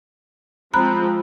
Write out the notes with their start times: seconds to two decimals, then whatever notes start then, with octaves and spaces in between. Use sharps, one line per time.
0.74 F3 G#3 C4 A#5 B5 F#6